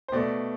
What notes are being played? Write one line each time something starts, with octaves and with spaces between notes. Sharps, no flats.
C5
B2 A3 D5